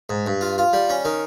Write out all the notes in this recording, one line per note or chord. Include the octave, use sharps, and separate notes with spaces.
G#2
G2
F4
F4
G3
C#4
D#3